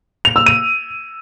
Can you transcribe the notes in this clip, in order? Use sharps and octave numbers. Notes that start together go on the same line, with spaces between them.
F7
E6
D#7